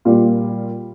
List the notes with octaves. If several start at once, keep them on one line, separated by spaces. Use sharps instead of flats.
A#2 G3 A#3 F4